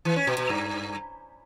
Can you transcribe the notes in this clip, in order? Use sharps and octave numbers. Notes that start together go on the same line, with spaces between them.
E3
C#4
B2
B2
G2